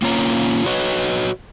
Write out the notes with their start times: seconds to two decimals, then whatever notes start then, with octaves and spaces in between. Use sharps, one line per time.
0.02 A#3 C#4 F4 C#5 A#5
0.66 F#4 B4 C#5 D#5